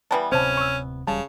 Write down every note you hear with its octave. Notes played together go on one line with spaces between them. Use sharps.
E3 G3 B3 A5
D1 C3 C4 C#4 C5 A5
C#6 E6
E1 C#3 G3 A5